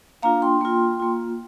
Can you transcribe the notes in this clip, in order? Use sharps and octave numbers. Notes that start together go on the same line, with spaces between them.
A#3 D4 F4 F5 A#5
G5 C6
A#3 F4
A#3 F4